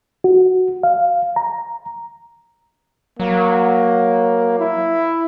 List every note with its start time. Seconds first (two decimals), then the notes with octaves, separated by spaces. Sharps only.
0.24 F#4
0.83 F5
1.36 A#5
3.20 F#3 A#3
4.60 E4